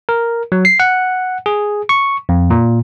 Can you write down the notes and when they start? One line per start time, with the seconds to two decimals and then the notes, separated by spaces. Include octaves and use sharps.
0.09 A#4
0.52 F#3
0.65 C7
0.80 F#5
1.46 G#4
1.89 C#6
2.29 F2
2.50 A#2